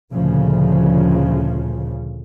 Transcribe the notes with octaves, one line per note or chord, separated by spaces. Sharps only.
D2 A#2 C#3 F3